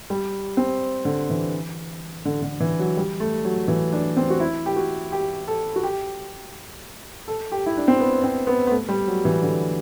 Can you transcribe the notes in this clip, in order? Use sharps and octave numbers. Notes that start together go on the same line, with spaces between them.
G3
C4
D3
E3
D3
D3
E3
F#3
G3
A3
F#3
E3
D4
C4
F#4
E4
G4
F#4
G4
A4
F#4
G4
A4
G4
E4
D4
C4
B3
C4
B3
B3
A3
G3
F#3
E3
D3